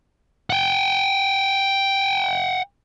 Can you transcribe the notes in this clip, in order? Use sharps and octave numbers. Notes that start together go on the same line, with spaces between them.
F#5 G5